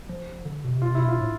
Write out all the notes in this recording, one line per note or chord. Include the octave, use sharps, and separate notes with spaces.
F3
D3
B2
C3
B2 F4
C3
B2 E4
F4
A2